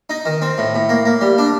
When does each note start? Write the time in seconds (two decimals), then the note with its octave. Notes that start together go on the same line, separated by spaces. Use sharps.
0.10 D#4
0.26 D#3
0.42 C4
0.58 A2
0.75 A2
0.89 A#3
1.06 A#3
1.21 G3
1.38 D4